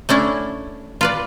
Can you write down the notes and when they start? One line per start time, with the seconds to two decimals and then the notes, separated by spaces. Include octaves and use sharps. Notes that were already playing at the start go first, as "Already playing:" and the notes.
0.09 A3 C#4 D4 E4
1.01 F4 B4 D5